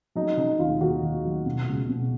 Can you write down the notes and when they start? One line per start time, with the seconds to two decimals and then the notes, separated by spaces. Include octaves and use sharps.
0.15 F#3 D#4
0.37 C#3 D#4
0.59 D#2 F4
0.81 D#2 F#4
1.03 D#2
1.25 F#3
1.46 B2
1.68 C#2
1.89 B2